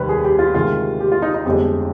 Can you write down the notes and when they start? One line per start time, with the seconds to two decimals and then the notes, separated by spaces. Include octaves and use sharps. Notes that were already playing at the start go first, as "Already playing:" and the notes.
Already playing: F1 D#2 D#3 G3 B4
0.09 G#4
0.24 G4
0.39 F4
0.54 D2 C3 D#3 G#3 F4
1.01 G4
1.12 F4
1.22 D#4
1.34 D#4
1.45 G1 F2 D3 G#3 G4